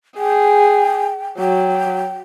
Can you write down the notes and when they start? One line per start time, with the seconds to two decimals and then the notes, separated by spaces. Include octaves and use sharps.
0.18 G#4 G5
1.39 F#3 G5